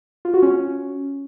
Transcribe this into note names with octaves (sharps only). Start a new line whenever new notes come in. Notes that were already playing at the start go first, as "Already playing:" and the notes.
F4
F#4
C#4